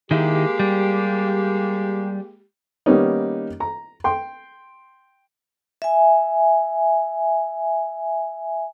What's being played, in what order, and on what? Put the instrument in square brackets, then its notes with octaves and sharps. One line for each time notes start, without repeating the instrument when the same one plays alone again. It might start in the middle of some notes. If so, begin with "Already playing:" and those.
[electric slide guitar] D#3 E4 [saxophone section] G#3 A#3 G4
[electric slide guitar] G3
[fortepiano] D#3 G3 A#3 B3 C#4 D#4
A#5
G5 C6
[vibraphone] E5 G#5